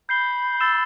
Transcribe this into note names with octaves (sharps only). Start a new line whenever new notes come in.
B5 G6 C7 G7
E6 A6 E7 G7